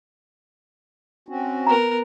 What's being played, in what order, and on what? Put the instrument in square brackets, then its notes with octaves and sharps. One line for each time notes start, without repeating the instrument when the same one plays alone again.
[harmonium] C4 C#4 F#4
[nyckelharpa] B3 A#4 [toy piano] A#5